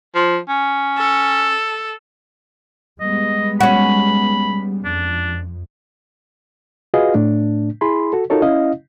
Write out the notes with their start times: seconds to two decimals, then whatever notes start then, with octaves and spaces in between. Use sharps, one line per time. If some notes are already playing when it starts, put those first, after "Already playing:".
0.15 F3
0.49 C#4
0.98 A4
3.00 G3 G#3 B3 D#5
3.60 C#4 F#4 B5
4.85 F2 D4
6.94 F4 F#4 G#4 B4 D#5 F5
7.14 A2 A3 D4
7.81 E4 G#4 B5 C6
8.13 F#4 A4
8.30 D#4 F4 F#4 A4 A#4 C#5
8.42 C#4 E4 D#5 F5